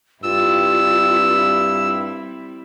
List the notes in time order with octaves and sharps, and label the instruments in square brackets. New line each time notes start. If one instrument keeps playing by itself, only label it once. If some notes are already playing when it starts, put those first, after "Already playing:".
[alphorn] G2 [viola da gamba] G3 C4 E4 [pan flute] F4 [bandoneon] E6